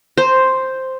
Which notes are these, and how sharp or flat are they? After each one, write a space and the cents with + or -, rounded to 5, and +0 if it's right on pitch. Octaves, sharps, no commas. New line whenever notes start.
C5 +0 A#5 -30